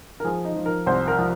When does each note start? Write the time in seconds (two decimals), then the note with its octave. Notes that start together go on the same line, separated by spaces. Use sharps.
0.20 A#4
0.24 F3 G#4
0.45 D#4
0.56 F3
0.66 A#4
0.86 C2 C5
1.08 A#4
1.18 F3